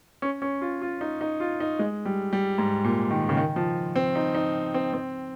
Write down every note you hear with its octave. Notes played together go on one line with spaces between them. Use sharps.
C#4
C#4
F4
F4
D#4
D#4
F4
D#4
G#3
G3
G3
G#2
A#2
D#3
C#3
D#3
F3
C4
D#4
D#4
C4
C4